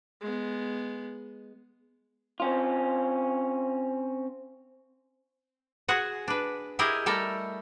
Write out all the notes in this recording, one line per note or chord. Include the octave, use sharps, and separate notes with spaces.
G#3 B3
C4 C#4 F4
F#4 G#4 F#5
D4 B4
E4 G4 G#4 A#4 D#5
G3 A3 A4 A#4